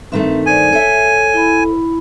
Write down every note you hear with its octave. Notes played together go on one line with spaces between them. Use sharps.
G2 D#3 A3 C4 E5
D#4 C5 D5 G#5
A4 C5 C#5 E5
E4 B5